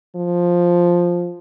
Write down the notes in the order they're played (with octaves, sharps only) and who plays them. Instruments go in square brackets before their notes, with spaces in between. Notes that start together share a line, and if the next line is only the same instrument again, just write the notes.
[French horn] F3